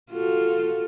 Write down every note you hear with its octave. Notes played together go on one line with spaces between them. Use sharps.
F4 F#4 A4